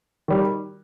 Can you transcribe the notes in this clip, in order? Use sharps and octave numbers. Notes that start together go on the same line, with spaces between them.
D#3 G3